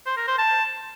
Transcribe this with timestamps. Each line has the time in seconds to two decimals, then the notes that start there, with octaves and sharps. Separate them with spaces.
0.07 C5
0.17 A#4
0.28 C5
0.38 A5